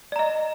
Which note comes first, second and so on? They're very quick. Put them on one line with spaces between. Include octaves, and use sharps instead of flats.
D5 A#5 D#5